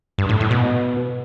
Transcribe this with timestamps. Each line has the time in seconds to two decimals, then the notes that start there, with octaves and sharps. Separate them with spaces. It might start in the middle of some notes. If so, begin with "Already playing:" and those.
0.18 G2
0.29 A2
0.40 A2
0.51 B2